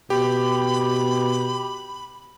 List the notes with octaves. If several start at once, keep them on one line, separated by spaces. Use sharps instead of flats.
B2 G4 B5